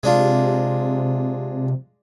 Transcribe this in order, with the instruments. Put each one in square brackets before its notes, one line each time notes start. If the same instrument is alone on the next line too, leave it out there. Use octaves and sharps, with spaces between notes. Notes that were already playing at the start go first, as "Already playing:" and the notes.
[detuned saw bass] C3 [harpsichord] G#3 D4 F4